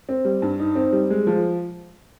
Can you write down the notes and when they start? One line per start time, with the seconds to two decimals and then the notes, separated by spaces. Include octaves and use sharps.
0.09 C4
0.25 G3
0.42 G2
0.60 D#4
0.75 C4
0.92 G3
1.10 G#3
1.27 F3